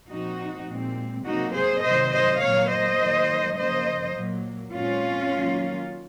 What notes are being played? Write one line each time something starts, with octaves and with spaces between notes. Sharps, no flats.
A#2 F3 C4 D#4 F#4
A#2 G#3 C4
C3 F#3 A#3 D#4 F#4
G#4 C5
C3 D#3 F#3 C5 D#5
C5 D#5
A#2 F#3 A#3 C#5 F5
C5 D#5
D#3 F#3 A#3
C#3 F3 A#3 C5 D#5
A#2 F#3 A#3
A#2 G#3 C4 C#4 F4
D#3 F#3 A#3